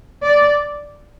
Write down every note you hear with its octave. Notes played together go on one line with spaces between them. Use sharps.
D5